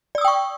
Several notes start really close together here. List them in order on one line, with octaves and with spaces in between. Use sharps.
D5 E6 D#6 G5 C#6